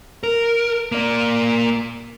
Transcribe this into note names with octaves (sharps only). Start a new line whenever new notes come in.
A#4
A#3 D5